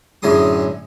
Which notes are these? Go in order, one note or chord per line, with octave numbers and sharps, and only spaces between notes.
F#2 A2 D3 G#4 C6 D#6